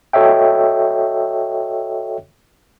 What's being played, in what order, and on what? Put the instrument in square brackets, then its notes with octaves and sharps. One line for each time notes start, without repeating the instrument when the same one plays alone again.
[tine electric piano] F#4 A4 C#5 D#5 E5 G5